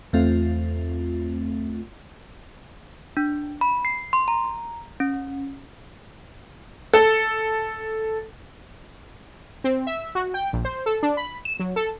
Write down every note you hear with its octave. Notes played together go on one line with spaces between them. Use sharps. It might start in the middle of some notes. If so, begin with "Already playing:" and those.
E2 A3 C4 F4
D4
B5
C7
C6
A#5
C#4
A4
C4
E5
F#4
G5
A#1
C5
A4
D4
B5
E7
F#3
A4